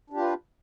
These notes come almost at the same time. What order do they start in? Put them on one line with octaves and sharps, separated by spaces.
D4 G4 F4 B4